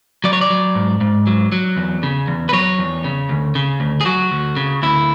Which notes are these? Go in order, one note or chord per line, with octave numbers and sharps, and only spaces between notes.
F#3 D5
C#5
D5
F#3
G#2
G#2
F#3
F#3
E2
C#3
E2
B4
F#3 C#5
E2
C#3
D2
C#3
D2
G#4
F#3 F#4
D2
C#3
D2 E4